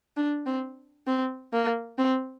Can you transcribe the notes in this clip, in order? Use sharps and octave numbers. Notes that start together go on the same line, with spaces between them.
D4
C4
C4
A#3
C4